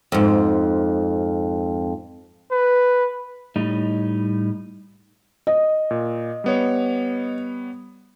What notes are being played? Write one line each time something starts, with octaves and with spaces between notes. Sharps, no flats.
F2 G#2
B4
A2 G3 D#4
D#5
A#2
G3 B3 C#5